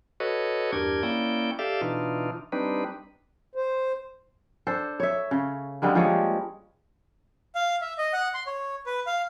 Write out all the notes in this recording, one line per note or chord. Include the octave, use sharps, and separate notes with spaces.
F#4 A4 B4 C#5 D#5
E2 G2 D4 G4 A#4 G#6
A#3 C#4 E4 D5 G5
G4 A4 D5 E5 F5
B2 E3 D4 D#4 F4
G3 C4 D4 D#4 B4
C5
D4 A4 C5
C#5 E5
C#3
D3 G3 G#3 A#3
F3 G3 G#3 C#5
F5
E5
D#5
F#5
C6
C#5
B4
F5